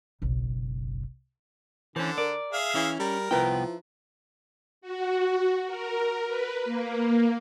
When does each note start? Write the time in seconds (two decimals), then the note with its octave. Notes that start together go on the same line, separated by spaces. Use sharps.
0.22 F#1 B1
1.96 D3 E3 C#4 C5 A5
2.18 A#4 D5
2.53 G#4 E5 F5
2.75 E3 C#4
2.99 G3 A#4
3.31 C2 F3 B3 E4 B4 G5 A#5
4.81 F#4
5.67 A#4
6.27 B4
6.65 A#3